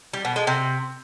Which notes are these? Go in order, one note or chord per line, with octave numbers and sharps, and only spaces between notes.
G3
B2
G#3
C3